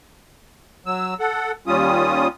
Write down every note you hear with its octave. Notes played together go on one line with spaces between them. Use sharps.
F#3 E6
A4 F#5
D#2 G3 C#4 F4 D#6